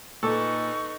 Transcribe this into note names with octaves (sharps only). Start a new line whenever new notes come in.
A#2 D#4 A4 B4 C#6